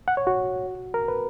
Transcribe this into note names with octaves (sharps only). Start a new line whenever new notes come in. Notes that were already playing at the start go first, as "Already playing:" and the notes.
F#5
C#5
F#4
A#4
B4